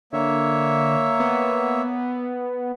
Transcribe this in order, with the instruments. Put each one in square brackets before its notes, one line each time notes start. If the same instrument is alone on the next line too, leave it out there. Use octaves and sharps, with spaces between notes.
[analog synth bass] D3 [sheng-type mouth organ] A#3 C#5 E5
[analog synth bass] B3